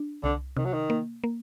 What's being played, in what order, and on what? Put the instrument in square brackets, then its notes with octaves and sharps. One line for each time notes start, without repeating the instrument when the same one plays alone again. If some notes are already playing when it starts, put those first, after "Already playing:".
Already playing: [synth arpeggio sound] D4
[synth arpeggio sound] C2 [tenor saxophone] D3
[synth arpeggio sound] C3 [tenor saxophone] D#3
[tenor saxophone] F#3
D#3
[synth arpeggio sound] A#3
A#3